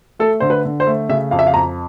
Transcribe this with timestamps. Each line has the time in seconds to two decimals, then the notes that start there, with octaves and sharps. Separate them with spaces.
0.19 A3 A4
0.40 D3 C5
0.50 B4
0.65 D3
0.80 C5
0.87 A3
1.09 C#3 E5
1.31 F2 F5
1.39 E5
1.47 F5
1.54 F2 A#5